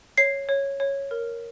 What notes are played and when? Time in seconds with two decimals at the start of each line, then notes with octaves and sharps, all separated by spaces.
0.17 C#5 C7
0.49 C#5
0.80 C#5
1.11 A#4